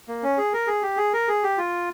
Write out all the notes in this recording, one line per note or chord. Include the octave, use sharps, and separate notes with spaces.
A#3
C#4
G#4
A#4
G#4
G4
G#4
A#4
G#4
G4
F4